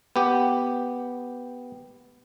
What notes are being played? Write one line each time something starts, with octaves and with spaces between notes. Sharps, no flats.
B3 G4